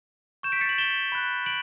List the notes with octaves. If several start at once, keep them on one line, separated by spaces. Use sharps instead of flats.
C#6 G6 E7
B6 D7
A6 C#7
D7 F#7
E7 G7
B5 F#6
D7 F#7